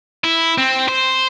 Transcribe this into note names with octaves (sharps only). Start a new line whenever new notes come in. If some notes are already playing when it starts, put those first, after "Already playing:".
E4
C4
C5